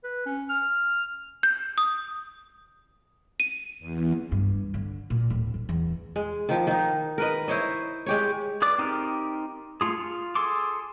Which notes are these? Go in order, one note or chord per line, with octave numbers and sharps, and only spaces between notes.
B4
C#4
F6
G6
D#6
D#7
E2
G2
D3
A#2
D1
F2
E2
G#3
D#3 F3
D#3 D#4
A#4 B4 D#5
E4 C5 C#5 D#5
G#3 G4 C#5
G#4 B4 D5 D6
C4 D#4 G4 A#4
A3 F4 G#4
F4
G#4 A4 C6 D6